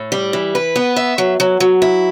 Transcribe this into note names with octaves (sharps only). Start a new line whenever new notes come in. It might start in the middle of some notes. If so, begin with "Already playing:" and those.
Already playing: A2
G3
E3
B4
B3
E5
F#3
F#3
F#3
E4